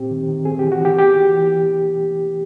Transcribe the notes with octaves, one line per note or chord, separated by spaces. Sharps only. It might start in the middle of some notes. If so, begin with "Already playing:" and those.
Already playing: A#2 C4 G4
D#3
D#3
C4 G#4
E3 G4
F#4
E3 G4
B3 G4
E3
E3